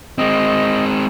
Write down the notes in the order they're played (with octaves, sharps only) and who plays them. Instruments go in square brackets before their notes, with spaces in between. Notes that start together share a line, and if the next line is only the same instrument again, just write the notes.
[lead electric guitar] G#3 C4 [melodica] D#5